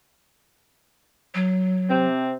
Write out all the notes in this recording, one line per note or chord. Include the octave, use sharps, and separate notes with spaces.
F#3
C3 C4